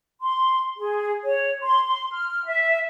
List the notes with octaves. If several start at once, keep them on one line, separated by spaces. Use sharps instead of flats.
C6
G#4
C#5
C6
C6
F6
E5